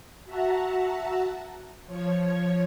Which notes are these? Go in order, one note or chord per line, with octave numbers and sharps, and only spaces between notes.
F#4 E5 F#5 A5 A#5
F3 C#5 G#6